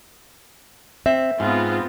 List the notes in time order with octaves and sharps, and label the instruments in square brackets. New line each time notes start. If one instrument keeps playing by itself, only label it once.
[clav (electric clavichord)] C4 [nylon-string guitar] E5
[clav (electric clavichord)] G#2 [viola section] B3 C4 F4